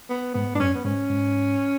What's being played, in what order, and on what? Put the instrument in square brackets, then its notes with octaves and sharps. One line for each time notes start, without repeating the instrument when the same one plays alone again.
[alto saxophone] B3
[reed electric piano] G#2 [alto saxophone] B3
[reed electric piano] G#2 [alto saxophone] D4
[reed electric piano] F#2 [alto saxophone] C#4
[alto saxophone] B3
[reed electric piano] G#2 [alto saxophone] C#4
[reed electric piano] G#2